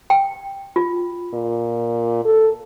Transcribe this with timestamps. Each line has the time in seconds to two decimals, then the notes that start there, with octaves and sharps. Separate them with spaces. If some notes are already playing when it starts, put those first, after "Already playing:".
0.10 G5
0.76 F4
1.34 A#2
2.25 A4